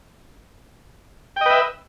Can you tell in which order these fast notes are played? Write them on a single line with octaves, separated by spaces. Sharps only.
G5 D#5 B4 E5